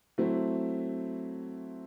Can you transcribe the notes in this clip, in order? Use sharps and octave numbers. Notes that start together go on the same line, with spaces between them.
F#3 A3 C4 E4